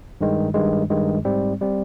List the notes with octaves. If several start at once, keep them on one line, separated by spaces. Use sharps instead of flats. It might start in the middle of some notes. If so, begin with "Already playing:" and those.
G2 D#3 G#3
G2 D#3 G#3
G2 D#3 G#3
G#2 G3 C4
G3 C4